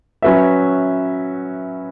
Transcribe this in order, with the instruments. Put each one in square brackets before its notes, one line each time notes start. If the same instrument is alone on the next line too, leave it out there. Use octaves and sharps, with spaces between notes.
[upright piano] F#3 C#4 F#4 B4 E5